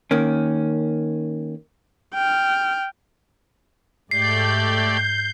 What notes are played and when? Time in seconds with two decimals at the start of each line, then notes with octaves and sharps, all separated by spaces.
0.11 D#3 A#3 C#4
2.14 G5 F6
4.11 G#2 A3 G4 D5 G6 C7